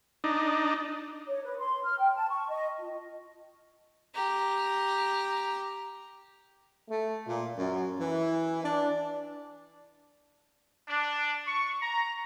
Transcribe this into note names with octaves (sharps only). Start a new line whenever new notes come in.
D4 D#4
C#5
B4
C6
F6
G5
A5
C#6
D#5
F4
G4 A#5
A3
A#2
F#2
E3
D4
D4
C#6
A#5